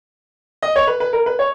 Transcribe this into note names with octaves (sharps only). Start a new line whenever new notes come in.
D#5
C#5
B4
B4
A#4
B4
C#5